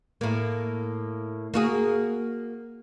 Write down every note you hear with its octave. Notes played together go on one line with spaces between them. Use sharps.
A2 A#3
A#3 F#4 G#4